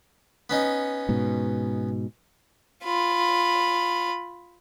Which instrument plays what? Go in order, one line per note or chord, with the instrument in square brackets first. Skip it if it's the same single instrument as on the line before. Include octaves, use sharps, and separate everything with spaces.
[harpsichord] B3 C#4 D#4
[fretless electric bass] G#2 B2
[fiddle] F4 B5